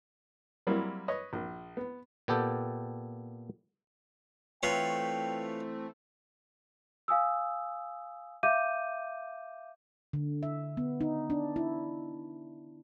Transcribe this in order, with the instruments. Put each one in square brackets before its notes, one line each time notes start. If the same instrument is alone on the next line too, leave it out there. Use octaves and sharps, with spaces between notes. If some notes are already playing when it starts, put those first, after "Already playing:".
[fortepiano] F#3 G3 A#3 C4 E4
B4 C#5 D#5
A#1
B3
[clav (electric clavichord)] A#2 B3 G4 A4 G5
[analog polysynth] E3 A3 C4 [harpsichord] F4 B4 C#5 [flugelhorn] G5
[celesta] F5 G#5 D#6 E6
E5 F5 D6 G6 D#7
[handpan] D3
E5
B3
D#4
D4
E4